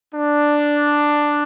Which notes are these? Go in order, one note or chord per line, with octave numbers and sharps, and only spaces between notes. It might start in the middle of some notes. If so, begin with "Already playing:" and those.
D4